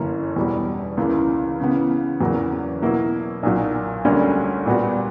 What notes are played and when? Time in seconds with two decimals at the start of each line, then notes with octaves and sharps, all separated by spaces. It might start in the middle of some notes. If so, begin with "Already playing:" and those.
Already playing: G1 F#2 E3 A#3 C#4
0.36 E2 B2 G3
0.97 C#2 C#3 E3 A#3
1.60 C#3 E3 B3
2.21 E2 C#3 F#3 A#3
2.82 B2 F#3 A#3 E4
3.43 B1 A#2 F#3
4.04 D2 D3 G3 A#3 C#4
4.66 A#2 G3 B3 F#4